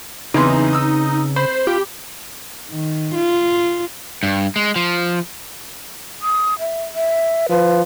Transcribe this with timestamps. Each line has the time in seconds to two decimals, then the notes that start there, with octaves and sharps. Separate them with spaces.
0.34 E2 C#3 E3 C4 D#4 B4 C6
0.73 D#6 E6
1.36 C5 B5
1.67 F4 G4
2.70 D#3
3.15 F4
4.23 G2
4.56 G#3
4.76 F3
6.22 D#6
6.59 E5
6.95 E5
7.49 F3 B4